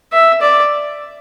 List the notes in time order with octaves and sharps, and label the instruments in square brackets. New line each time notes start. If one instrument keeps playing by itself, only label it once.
[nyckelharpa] E5
D5